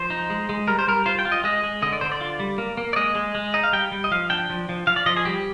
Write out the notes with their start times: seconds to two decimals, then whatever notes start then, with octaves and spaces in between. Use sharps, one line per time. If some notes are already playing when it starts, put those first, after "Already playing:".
Already playing: F3 C5
0.10 D#4
0.30 G#3
0.49 G#3
0.67 G3 A#4
0.79 C5
0.87 G3 A#4
1.06 F4 C5
1.19 G5
1.25 F4
1.32 D#5
1.44 G#3 D#5
1.64 G#3
1.82 D3 D#5
1.93 D5
2.01 D3 C5
2.12 D5
2.21 F4
2.40 G3
2.58 A#3
2.77 A#3
2.93 D5
2.96 G#3 D#5
3.15 G#3
3.35 G#3
3.54 D#4 D#5
3.63 F5
3.73 G3 G5
3.91 G3
4.04 D#5
4.11 F3 F5
4.30 D4 G5
4.50 F3
4.69 F3
4.87 F3 F5
4.96 D5
5.06 F3 D#5
5.17 G#4
5.25 G3 G4